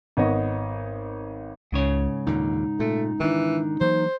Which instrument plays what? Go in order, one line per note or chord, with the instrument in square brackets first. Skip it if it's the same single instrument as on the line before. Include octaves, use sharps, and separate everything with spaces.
[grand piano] G#1 B3 C#5 D#5
[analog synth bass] C#2 [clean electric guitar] G#2 C#3 C#5
[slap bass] D#2 A#2 D3 [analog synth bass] D#4
[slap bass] A#2 [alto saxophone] A3
[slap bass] D#3 D4 [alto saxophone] E3
[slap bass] E3 F#3 A#3 [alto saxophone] C5